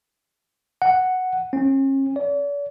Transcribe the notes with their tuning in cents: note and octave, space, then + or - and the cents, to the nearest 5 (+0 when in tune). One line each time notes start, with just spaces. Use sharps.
F#5 +0
C#4 -40
D5 -45